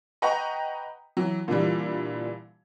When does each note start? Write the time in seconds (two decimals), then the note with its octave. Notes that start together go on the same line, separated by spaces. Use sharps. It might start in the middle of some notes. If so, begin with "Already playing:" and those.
0.22 B4 D#5 F#5 G5 A#5 C#6
1.17 E3 F#3
1.48 A#2 D3 E3 G3